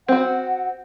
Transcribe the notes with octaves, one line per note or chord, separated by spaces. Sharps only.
C4 F#4 F#5